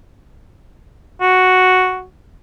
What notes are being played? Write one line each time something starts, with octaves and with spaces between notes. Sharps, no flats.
F#4